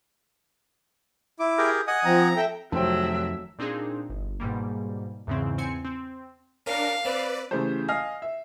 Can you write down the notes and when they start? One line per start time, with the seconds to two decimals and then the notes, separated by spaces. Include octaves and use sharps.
1.40 E4 D6
1.58 G4 G#4 A#4
1.88 D#5 F#5 G#5 D#6
2.05 F3 C4 A#5
2.36 A4 E5 G5
2.72 F1 F2 D#3 F#3 C5 E5 G5
3.58 A#2 C4 D4 D#4 G#4
4.10 G1
4.40 G#2 B2 G3 A#3
5.27 E2 G#2 C#3 E3 C4
5.58 E2 C4 G#5 C#7
5.85 C4
6.66 C#4 D4 A#4 F5
7.05 C4 B4 D5
7.51 C#3 E3 A3 G4 C5
7.88 D#5 F5 G#5 F6 C7
8.22 E5